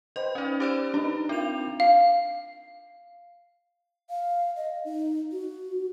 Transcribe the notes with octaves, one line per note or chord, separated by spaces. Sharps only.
B4 C5 D#5 G5
C#4 D#4 B4 D5
G4 C5 D5 D6
D4 D#4 G4 B4 A#5
C4 F4 A#4 G5 F7
F5
F5
D#5
D#4
F#4